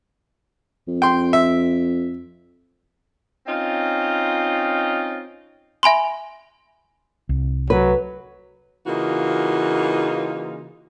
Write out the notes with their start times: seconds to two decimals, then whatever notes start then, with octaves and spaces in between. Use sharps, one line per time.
0.88 F2
1.02 G5 C6
1.33 E5
3.47 C4 C#4 D#4 F4
5.83 E5 G#5 B5 C6
7.29 C2
7.70 F#3 B4
8.87 C#3 E3 A#3 D#4 F4 F#4